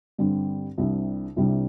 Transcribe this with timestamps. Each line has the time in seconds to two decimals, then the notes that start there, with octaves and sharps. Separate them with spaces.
0.18 G2 D3 G3 C4
0.78 C2 C3 G3 D4
1.36 C2 C3 G3 D4